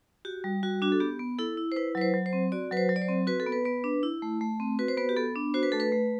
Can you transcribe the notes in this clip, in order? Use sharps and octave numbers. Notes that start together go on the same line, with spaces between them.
F#4 G4
G3
G3 F#4
D4 F#4
A4
B3 G4
B3
E4 A4
E4
C5
E4 B4
F#3 B4
C5
F#3
C5
C4
F#4 D5
F#3 B4
C5
F#3
D5
C5
C4
F#4 B4
A4
B3
B4
B3 B4
D4
E4
A3
A3
C4
F#4 B4
C5
B3 B4
G4
B3 A4
D4
F#4 C5
B4
A3 A4
B4
A3